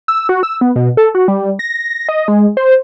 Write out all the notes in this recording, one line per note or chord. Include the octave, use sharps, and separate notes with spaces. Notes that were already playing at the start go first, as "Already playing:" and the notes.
E6
F#4
E6
B3
B2
A4
F#4
G3
A#6
D#5
G#3
C5